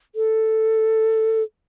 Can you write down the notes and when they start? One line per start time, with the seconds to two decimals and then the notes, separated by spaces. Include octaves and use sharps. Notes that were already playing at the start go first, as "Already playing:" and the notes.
0.15 A4